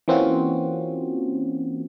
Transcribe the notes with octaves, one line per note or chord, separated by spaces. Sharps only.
E3 A#3 C4 C#4 F4 F#4